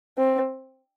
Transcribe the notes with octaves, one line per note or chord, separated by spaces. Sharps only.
C4